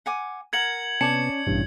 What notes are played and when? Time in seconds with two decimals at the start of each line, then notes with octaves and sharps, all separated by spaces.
0.06 F#5 G#5 D6
0.53 A#4 F#5 G#6 C#7 F#7
1.01 C3 B3 C#4 C#5 D5 A5 C#7
1.47 A1 G2 B2 E3 C#4